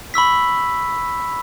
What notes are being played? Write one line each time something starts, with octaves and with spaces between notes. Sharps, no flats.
B5 C#6 E6 B6